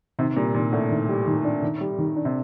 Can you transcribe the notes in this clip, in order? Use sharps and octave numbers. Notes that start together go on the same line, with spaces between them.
C3 D#3
A#2 G3
A#2 D#3
A2 D4
D#3
G3
D#3
D4
D#3
G3
D#3
D4
C3